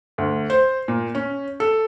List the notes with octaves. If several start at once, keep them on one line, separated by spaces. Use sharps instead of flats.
D2
C5
A#2
C#4
A4